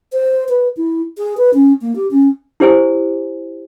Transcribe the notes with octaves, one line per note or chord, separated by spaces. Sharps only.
C5
B4
E4
G#4
B4
C#4
A#3
G4
C#4
E4 G4 C5 G#5